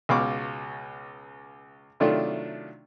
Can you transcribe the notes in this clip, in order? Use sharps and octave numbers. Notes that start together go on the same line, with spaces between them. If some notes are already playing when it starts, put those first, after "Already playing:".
C#2 B2 F5 C#6 D6
C3 D#3 F#3 A3 D4 F4